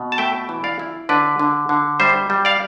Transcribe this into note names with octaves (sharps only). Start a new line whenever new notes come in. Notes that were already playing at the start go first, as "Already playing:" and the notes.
Already playing: B2
A5
A3 E5 G5
E3
D5 F5
E4
D3 B4 D5
D3
D3
G3 C5 E5
G3
D5 F5